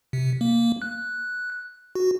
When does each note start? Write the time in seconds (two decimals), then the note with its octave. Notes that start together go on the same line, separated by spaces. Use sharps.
0.13 C3
0.41 A#3
0.82 F#6
1.95 F#4